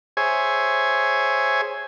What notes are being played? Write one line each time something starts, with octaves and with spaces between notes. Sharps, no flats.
G#4 C5 C#5 E5 G#5